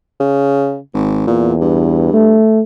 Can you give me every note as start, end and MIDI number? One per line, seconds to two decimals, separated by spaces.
0.20 0.79 49
0.94 1.24 32
1.27 2.13 40
1.27 1.54 46
1.61 2.41 43
2.14 2.61 57